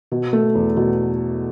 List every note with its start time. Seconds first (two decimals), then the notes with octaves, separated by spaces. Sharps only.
0.12 B2
0.33 A3
0.55 E2
0.77 B2